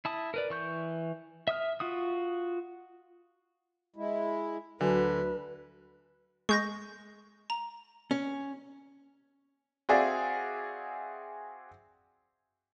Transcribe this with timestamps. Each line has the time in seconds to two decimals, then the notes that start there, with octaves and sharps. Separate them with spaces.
0.05 E4 A5 D#6
0.34 A#4 B4 D5
0.50 E3 C#6 G6
1.48 E5 D#6 F6
1.80 F4 F#4 D#6
3.96 G#3 E4
4.81 D2 D3 F#3 F#4 B4 G#5
6.49 G#3 C#6 G6 A#6
7.50 A#5
8.11 C#4
9.89 C4 F#4 G#4 D5 E5 F5